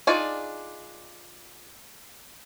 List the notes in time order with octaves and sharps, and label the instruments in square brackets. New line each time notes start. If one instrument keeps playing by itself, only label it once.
[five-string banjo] D4 D#4 F4 G#4 D5